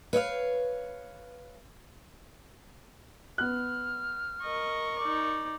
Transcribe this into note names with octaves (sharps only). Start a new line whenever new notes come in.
B4 C#5 D#5 F5
B3 F6 F#6
A#4 D#5 C#6
D#4 D5